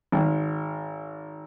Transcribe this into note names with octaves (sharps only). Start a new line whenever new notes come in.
G#1